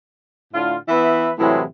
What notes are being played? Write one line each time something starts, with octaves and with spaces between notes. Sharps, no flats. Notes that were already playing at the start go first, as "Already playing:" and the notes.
A2 D3 F4
E3 B3 B4 E5
A2 C3 E3 F#3 G#3